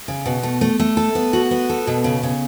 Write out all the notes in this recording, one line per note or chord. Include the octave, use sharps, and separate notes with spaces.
C#3
B2
A3
A3
A3
A4
B3
F#4
B3
A4
B2
C#3
C#3